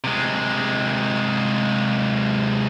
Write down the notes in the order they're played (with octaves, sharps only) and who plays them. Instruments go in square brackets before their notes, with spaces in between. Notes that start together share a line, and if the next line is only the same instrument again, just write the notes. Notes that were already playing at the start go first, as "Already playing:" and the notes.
[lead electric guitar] C3 G#3